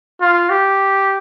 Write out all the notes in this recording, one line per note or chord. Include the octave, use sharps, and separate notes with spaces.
F4
G4